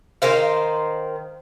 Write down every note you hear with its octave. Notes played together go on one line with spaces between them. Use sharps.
D#3 A#4 C5 F5